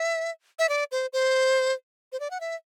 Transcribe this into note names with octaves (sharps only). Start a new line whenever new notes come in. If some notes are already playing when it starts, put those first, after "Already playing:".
Already playing: E5
E5
D5
C5
C5
C5
D5
F#5
E5